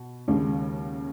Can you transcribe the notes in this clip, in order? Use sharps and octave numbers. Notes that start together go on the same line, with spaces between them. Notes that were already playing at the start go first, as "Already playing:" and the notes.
Already playing: B2
D#2 C#3 G#3